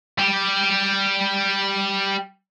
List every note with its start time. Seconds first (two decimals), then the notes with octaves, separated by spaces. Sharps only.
0.18 G3 G4